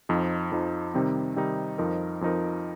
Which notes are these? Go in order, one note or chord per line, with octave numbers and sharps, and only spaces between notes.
F2 F3 D#4
F2 F3 D#4
C3 D#3 G3 C4 D#4
C3 D#3 G3 C4 D#4
F2 F3 D#4 A#4
F2 F3 D#4 A#4